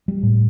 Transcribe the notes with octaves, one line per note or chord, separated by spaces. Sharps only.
G3
A2